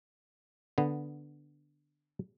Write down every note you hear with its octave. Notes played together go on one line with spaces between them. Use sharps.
D3 B3